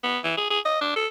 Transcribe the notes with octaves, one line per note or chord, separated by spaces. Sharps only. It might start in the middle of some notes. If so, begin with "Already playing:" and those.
B3
E3
G#4
G#4
D#5
D4
A4